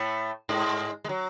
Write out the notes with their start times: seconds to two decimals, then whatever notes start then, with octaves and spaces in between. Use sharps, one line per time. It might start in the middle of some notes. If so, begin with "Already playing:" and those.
Already playing: A2 A3
0.49 G#2 G#3
1.04 G#3
1.09 F#3